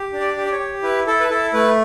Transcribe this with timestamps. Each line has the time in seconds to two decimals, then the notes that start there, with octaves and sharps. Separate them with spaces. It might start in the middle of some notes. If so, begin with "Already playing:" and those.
Already playing: G4
0.13 D4
0.20 D5
0.37 G4
0.46 D5
0.52 C#5
0.59 G4
0.83 E4 B4
1.07 E4 A4
1.20 B4
1.29 E4 A4
1.53 A3 B4